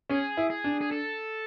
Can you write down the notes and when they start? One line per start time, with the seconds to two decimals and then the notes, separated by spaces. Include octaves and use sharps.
0.09 C#4 G#4
0.37 E4
0.50 G#4
0.64 D4
0.81 G#4
0.91 A4